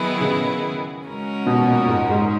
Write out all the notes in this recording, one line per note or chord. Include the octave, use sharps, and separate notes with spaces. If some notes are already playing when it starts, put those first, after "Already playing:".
Already playing: D#3 F#3 B3 E4 G#4
C#3
C#3 G#3 C#4 F#4 A#4
B2
A#2
G#2
G#2